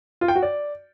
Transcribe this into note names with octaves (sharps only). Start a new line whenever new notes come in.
F4
G5
F#4
D5